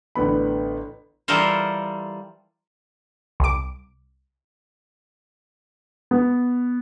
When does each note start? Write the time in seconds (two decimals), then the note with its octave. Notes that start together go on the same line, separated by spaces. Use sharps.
0.15 A1 D3 B3 B5
1.28 E3 G3 F4 A4 A#4 C5
3.40 C2 D6
6.11 B3